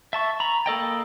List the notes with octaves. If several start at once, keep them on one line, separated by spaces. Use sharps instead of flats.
E5 A5 C#6
A#5 B5
A#3 A4 D#5 G5